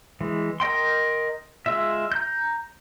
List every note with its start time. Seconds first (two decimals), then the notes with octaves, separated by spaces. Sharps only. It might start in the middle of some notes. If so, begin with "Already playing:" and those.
0.21 E3 G#3
0.60 A#4 D#5 G5 C6
1.66 G#3 F4 E5
2.12 A#5 G6